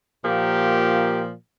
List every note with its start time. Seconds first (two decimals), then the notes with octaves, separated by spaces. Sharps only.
0.24 A#2 F3 A#3 G4